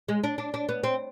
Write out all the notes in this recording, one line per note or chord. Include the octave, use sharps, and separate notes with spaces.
G#3
D4
D4
D4
B3
C4